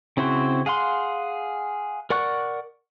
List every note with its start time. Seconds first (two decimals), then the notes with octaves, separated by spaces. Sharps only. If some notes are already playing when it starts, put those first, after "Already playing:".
0.17 C#3 C4 E4 F#4 C5
0.66 G#4 F5 F#5 C6
2.10 A#4 D5 F#5 C#6 F#6